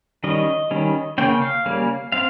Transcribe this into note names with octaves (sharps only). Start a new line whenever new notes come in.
D#3 G3 C#4 D#5
D#3 G3 C#4
C#3 G3 A#3 C#4 G5
F5
C#3 G3 A#3 C#4
C4 F5